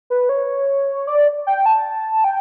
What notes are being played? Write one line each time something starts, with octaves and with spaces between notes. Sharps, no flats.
B4
C#5
D5
G5
A5
G5